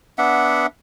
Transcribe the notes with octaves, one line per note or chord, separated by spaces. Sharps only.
B3 D4 E5 F#5